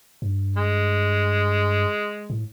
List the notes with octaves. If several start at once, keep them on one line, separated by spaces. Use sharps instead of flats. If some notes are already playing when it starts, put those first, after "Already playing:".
G2
G#3
A2